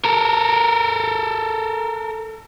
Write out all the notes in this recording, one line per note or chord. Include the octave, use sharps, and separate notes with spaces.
A4 A#4